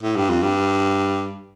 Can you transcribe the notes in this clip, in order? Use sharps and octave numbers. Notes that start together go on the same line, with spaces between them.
A2
G2
F2
G2